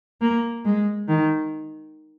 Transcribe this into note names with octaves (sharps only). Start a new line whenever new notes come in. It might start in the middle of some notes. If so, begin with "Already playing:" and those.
A#3
G#3
D#3